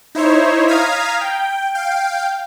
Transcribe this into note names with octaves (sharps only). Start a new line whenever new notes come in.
D#4 E4 C5 C#5
F5 A#5 D#6 F6 G#6 B6
G5
F5 G5